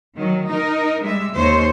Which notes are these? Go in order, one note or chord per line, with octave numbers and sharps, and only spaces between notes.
D#3 F#3
D#4 A#4
G3 G#3 E5
D#2 C5 C#5